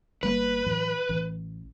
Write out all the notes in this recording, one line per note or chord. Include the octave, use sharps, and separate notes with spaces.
G1 G3 A#3 B4
A2 E3 F#3
A1 E3